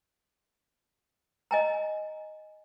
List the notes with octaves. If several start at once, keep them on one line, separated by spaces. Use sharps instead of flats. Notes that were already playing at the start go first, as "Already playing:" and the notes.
D#5 G#5 A#5